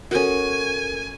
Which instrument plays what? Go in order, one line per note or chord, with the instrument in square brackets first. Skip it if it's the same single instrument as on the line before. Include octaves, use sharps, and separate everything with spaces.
[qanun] C#4 F#4 [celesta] A4 A#4 [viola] G#5